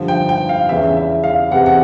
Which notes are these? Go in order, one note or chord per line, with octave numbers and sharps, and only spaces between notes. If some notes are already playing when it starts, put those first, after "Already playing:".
Already playing: G2 D3 F3
G5
G5
F5
E2 C#3 E3 E5
E5
F5
E2 C3 E3 F#5
F#5